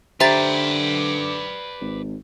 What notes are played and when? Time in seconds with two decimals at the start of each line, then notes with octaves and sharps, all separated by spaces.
0.20 D3 G4 B4 C5 D5 E5 A#5 A6
1.81 G#1